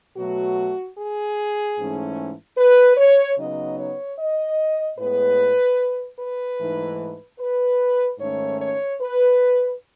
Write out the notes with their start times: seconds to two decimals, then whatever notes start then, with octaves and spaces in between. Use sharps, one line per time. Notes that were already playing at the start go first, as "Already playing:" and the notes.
0.16 B2 F#3 A3 F#4
0.96 G#4
1.78 G#2 E3 A3 C#4
2.57 B4
2.97 C#5
3.37 C#3 F#3 B3 D#4 D#5
3.77 C#5
4.18 D#5
4.98 A2 G#3 B3 B4
6.19 B4
6.59 G#2 E3 A3 D#4
7.39 B4
8.19 G#2 D#3 A3 C#4 C#5
8.60 C#5
9.00 B4